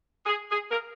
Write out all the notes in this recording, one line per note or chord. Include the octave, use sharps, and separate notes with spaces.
G#4
G#4
A#4